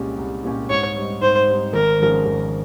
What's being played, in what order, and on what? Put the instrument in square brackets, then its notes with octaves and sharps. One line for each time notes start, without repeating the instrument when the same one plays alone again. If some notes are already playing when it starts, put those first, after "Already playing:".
Already playing: [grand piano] C2 A#2 G#3 C#4 G4
C2
A#2 G#3 C#4 G4
[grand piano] G#2 [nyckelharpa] C#5
[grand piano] G3 C4 D#4
[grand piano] G#2 [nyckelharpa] C5
[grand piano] G3 C4 D#4
[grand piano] G#1 [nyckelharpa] A#4
[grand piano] G#2 F3 G#3 C#4
G#1